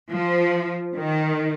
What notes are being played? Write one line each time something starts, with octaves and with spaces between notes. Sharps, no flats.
F3
D#3